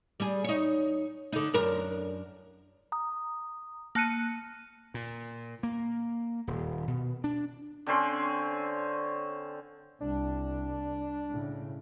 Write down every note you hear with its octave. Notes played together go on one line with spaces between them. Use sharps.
G3 G#4
D#4 C#5
D3 D#4
F#2 D4 A#4
A#5 D#6
A#3 A5 F#6 C#7 D#7
A#2
A#3
D#1
B2
D4
D3 C4 C#4 C6
C2 D4
A2 C#3